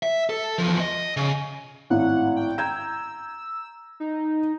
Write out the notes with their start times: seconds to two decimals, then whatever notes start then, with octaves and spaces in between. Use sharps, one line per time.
0.03 E5
0.30 A4
0.58 E2 F3
0.80 D#5
1.17 C#3
1.90 G#1 A2 F#5
2.36 G5
2.58 A#5 E6 G6 G#6
4.00 D#4